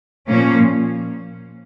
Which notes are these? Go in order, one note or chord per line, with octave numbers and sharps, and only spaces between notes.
A#2 F3 A#3 C#4